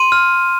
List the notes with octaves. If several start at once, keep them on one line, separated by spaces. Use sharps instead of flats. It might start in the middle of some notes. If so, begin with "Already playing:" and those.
Already playing: C6 D#7
F6